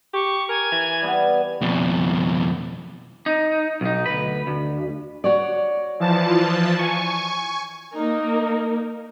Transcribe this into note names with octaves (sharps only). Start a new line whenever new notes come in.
G4 C#6
A#4 G#5
E3
G3 B3
F2 B2
D#4
B1 D#4
D2 B4
D2
F#4 C#5 D5
E3 F3 A5
G#5 C#6
A#3 D#4 A#4